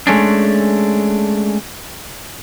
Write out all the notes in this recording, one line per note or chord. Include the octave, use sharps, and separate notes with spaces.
G#3 A3 C#4 D4